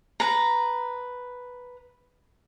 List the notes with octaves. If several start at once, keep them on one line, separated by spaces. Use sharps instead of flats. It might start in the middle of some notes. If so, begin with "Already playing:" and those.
B4 A#5